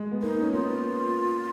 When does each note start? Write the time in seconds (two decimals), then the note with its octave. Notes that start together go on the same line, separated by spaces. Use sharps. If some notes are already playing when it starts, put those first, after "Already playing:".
Already playing: G#3
0.11 B3
0.22 A#3 D#4
0.42 C#4
0.52 B3 F4